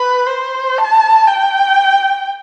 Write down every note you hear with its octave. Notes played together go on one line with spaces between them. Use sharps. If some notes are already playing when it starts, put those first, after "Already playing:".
Already playing: B4
C5
A5
G5